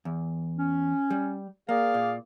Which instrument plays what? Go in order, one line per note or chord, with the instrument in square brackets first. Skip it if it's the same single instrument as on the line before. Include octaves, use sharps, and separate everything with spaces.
[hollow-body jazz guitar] E2
[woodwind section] C#4
[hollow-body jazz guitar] G3
[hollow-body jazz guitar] A#3 [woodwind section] G#4 D5 F5
[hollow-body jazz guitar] A#2